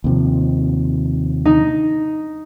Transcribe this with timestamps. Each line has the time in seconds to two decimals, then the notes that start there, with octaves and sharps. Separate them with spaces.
0.04 D#2 C3 F3
1.45 D#4